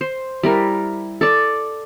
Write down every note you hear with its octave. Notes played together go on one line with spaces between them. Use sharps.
C5
G3 E4 A#4
A4 D5